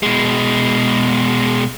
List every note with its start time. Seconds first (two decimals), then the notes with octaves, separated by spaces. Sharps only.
0.03 B2 G#3